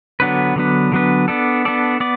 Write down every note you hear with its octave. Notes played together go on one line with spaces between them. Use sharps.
D3 F#3 B3 D4 B4
D3 F#3 B3 D4 B4
D3 F#3 B3 D4 B4
B3 D4 A4 D5
B3 D4 A4 D5
B3 D5